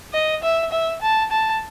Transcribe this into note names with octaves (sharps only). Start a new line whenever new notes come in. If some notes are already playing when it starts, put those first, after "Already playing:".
D#5
E5
E5
A5
A5